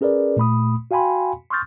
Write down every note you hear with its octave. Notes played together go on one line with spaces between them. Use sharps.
C#4 G#4 A#4 B4 D5
A#2 A3 B5 D#6
F#4 F5 G5 G#5 B5 C6
C6 C#6 D#6 F6 G6 A6